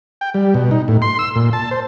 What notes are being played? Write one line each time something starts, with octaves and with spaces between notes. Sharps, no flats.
G5
G3
B2
D#4
A2
C6
E6
A#2
A5
C5